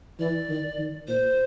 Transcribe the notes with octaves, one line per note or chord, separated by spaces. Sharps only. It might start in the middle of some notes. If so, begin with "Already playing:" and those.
E3 D5
D#3
D#3
A#2 C5